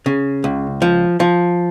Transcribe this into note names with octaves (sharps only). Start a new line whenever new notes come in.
C#3
C#2
F3
F3